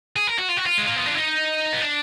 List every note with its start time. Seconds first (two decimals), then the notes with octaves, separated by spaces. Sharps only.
0.16 G#4
0.27 A#4
0.38 F#4
0.49 F4
0.57 F#4
0.66 F4
0.78 G#3
0.88 A#3
0.96 B3
1.06 D4
1.15 D#4
1.73 B3
1.81 D4